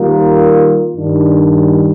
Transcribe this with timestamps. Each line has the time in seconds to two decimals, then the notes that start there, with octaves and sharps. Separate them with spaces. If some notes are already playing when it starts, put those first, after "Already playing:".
Already playing: D#3 G3 A#3 F4 A#4
0.95 G2 D#3 G3 D4